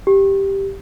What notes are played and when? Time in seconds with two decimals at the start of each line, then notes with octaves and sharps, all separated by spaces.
0.07 G4